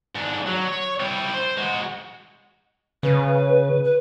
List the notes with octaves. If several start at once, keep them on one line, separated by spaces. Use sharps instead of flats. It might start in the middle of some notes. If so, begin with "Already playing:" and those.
G#2 D4
F#3
C#5
G3 E4
C5
G#3 F#4
C#3 B4
B4